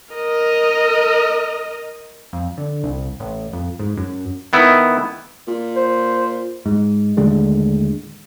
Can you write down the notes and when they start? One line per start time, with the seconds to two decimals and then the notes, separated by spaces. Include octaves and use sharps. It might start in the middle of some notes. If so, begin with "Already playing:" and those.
0.15 A#4 D#5
2.33 F2
2.57 D3
2.84 C2
3.20 A1
3.53 F2
3.79 G#2
3.97 F#2
4.53 D#3 B3 E4
5.48 A#2
5.76 C5
6.66 G#2
7.17 D#2 A2 D3 G#3